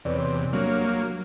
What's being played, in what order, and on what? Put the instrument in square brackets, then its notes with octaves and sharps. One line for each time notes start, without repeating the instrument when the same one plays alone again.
[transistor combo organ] E2 C3 [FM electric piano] B4 C#5 D5
[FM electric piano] C6
[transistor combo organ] F#3 A#3 [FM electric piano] G3 D4 C#5